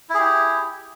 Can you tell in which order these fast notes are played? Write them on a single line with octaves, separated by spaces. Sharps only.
E4 G#4 G4